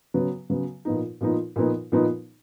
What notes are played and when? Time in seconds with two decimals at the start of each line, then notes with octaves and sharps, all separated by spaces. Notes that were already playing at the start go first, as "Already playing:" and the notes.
0.14 C#3 F#3 B3
0.50 C#3 F#3 B3
0.85 A#2 F3 B3 D#4
1.21 A#2 F3 B3 D#4
1.56 A#2 F3 B3 D#4
1.92 A#2 F3 B3 D#4